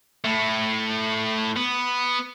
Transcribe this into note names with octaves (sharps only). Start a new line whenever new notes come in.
A2 A3
B3